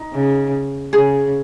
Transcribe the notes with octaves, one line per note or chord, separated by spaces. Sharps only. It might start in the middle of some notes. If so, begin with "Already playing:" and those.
Already playing: D#4
C#3
C#3 G#4